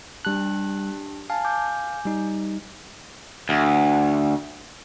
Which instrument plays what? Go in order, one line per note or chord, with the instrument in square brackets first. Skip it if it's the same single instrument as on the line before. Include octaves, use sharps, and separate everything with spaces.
[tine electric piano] G3 F#6 [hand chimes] D4 G4 A5
[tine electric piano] F5 [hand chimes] G#5 A5
[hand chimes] G#5 D6 G6
[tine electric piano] G3 D#4
[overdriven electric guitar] D2